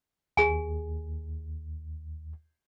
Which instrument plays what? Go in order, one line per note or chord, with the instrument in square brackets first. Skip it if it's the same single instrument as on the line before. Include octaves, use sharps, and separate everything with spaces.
[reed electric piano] D#2 [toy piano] G#4 G#5